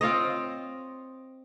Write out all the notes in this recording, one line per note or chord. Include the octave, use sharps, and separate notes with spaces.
C4 F4 C#5 D#5